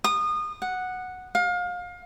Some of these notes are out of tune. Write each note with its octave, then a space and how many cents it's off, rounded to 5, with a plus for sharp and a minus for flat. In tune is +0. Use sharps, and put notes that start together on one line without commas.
D#6 -25
F#5 -5
F5 +30